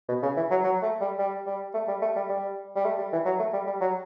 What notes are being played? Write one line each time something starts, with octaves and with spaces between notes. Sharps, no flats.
B2
C#3
E3
F#3
F#3
A3
G3
G3
G3
A3
G3
A3
G3
G3
G3
A3
G3
E3
F#3
A3
G3
G3
F#3